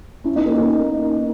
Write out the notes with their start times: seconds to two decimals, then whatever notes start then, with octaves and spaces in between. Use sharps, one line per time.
0.24 C#4 E4
0.35 B3 D#4
0.46 A#3 C#4
0.57 A#3 C#4